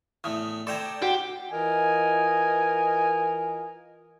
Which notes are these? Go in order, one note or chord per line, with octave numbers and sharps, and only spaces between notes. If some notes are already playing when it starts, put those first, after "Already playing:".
E2 A2 A3 D#6
A4 C5 D5 G5 A#5 G#6
F#4 G4 F#5
E3 F4 A#4 D#5 G#5